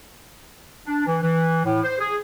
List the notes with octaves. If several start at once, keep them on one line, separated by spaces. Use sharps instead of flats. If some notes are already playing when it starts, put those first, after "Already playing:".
D4
E3
E3
A2
C5
G#4